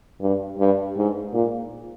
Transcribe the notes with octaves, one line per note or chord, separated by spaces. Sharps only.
G2
G2
G#2
A#2